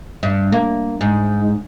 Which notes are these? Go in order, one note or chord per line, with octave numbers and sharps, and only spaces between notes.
G2
A#3
G#2